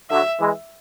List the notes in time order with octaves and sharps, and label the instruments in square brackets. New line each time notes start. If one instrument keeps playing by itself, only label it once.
[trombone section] D3 F#3 [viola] E5
[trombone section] E3 G#3